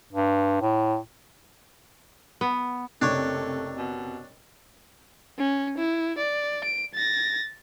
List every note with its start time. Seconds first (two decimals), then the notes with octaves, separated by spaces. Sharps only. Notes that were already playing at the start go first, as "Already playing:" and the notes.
0.13 G2
0.62 A2
2.41 B3
3.02 F#1 C3 A3 D4 C#5
3.78 B2
5.39 C#4
5.78 E4
6.18 D5
6.64 D7
6.95 A6 A#6